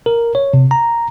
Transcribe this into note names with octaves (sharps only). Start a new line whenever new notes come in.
A#4
C#5
C3
A#5